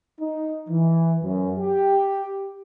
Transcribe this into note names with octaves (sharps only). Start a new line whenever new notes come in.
D#4
E3
F#2
G4